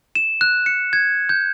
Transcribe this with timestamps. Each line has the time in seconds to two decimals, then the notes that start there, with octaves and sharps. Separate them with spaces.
0.15 E7
0.41 F#6
0.66 C#7
0.93 G#6
1.29 G6